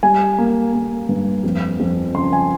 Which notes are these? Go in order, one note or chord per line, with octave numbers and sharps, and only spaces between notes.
G3 G#5
A#3
A#3
G2
F2
F2
C#3 C6
G#5